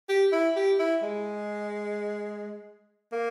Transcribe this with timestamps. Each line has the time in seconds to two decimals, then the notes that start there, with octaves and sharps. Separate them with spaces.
0.09 G4
0.32 E4
0.56 G4
0.79 E4
1.02 G#3
3.12 A#3